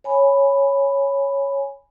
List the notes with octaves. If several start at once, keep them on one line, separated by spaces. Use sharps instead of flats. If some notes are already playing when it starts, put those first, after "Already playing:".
C#5 G#5 B5